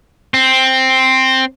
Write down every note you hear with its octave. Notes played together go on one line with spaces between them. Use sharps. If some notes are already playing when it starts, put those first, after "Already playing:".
C4